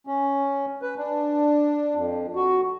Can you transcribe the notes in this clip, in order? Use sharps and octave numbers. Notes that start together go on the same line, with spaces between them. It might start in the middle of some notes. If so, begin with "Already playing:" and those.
C#4
B4
D4
F2
F#4